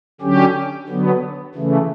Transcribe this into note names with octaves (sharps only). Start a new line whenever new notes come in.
D3 F#3 C#4 G4
D3 F#3 B3
C#3 E3 A3